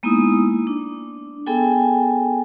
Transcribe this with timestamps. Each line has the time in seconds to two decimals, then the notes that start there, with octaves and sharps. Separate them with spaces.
0.03 G#3 A#3 B3 D#4 E4 D#6
0.67 D4
1.46 B3 G#4 A4 G5 G#5